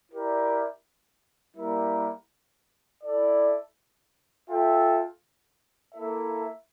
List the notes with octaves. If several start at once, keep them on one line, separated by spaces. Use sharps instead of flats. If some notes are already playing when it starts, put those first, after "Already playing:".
E4 G4 A#4 D5
G3 A#3 E4 A#4
E4 A4 D5
F4 A4 E5 G5
A#3 E4 A4 E5